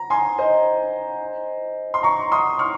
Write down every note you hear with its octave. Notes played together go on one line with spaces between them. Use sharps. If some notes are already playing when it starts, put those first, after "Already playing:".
Already playing: A#5
G#5 C6
C5 D#5
C6
A#5 C#6
C6 D#6
C#6 F6